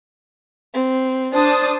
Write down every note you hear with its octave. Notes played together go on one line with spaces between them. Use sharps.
C4
D4 C5 A5 D#6